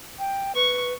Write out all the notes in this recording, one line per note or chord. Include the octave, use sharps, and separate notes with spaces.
G5
B4 C#6